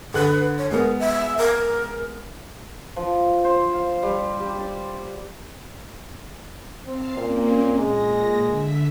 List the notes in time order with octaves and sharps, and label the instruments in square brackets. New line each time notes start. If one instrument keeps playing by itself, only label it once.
[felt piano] D3 F#6 [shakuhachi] B4
[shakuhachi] C#5
[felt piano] G#3 B3 [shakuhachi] A#4
[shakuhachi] E5
A#4
[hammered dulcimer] F3
C5
F5
G3
G4
D5
[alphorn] C4 [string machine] F5 A5 C7
[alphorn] A#2 [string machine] A#3 C4 C#4
[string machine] A#2 A#6 [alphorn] G#3
[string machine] D3 E5 B6